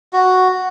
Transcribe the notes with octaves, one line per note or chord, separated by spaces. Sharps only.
F#4